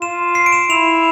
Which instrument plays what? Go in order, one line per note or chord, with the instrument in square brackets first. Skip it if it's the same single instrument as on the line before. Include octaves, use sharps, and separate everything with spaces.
[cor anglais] F4 [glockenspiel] E7
[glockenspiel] C7
D7
E7
[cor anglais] E4 [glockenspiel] F7